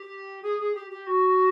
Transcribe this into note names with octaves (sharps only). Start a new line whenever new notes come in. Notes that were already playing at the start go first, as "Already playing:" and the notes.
Already playing: G4
G#4
G#4
G4
G4
F#4